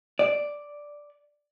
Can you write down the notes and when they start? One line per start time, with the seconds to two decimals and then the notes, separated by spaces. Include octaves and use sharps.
0.19 D5